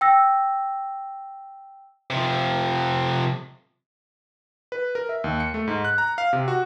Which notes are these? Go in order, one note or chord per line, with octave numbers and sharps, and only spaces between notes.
G5 E6 A#6
C3 F3
B4
A#4
E5
D#2
C#7
A3
G#2
F#6
A#5
F5
C3
F#4